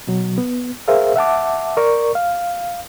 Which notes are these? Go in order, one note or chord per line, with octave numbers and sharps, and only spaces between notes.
B2 F#3
B3
G#4 A#4 C5 E5 F5
E5 F#5 A5 D6
A#4 D5 C#6
F5